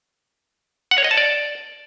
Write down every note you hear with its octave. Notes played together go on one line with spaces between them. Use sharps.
F#5
C#5
D#5
A5
D5